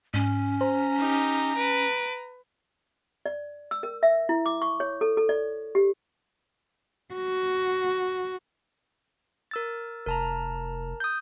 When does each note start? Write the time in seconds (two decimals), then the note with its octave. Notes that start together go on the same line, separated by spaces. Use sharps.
0.14 G#2 C#4
0.61 C5 A#5
0.98 D#4 G4
1.56 B4 D7
3.26 D5
3.71 E6
3.83 A#4
4.03 E5
4.29 E4
4.46 D6
4.62 C#6
4.80 C#5
5.01 A4
5.17 A4
5.29 D5
5.75 G4
7.14 F#4
9.51 A#4 E6 A6
10.06 F1 A#4 A5 A#5
11.00 D#6 G6